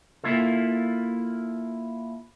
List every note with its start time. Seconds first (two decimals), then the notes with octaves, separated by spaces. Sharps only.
0.24 A#3 E4 F4 A4